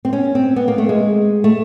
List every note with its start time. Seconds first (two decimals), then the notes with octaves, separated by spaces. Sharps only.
0.05 C4
0.13 C#4
0.35 C4
0.56 B3
0.68 A#3
0.78 A3
0.89 G#3
1.44 A3